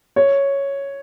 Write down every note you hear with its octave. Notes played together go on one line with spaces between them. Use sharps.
C#5